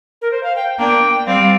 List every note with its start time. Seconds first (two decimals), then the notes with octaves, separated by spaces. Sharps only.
0.22 A#4
0.31 C5
0.43 F5
0.56 G5
0.78 A#3 D4 G5
1.26 G3 C4 F5